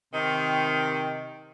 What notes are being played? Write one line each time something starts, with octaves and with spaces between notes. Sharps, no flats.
C3 D#3